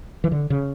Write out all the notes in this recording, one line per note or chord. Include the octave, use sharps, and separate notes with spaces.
E3
D3
C#3